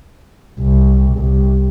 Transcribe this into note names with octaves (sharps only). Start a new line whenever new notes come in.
C2
C2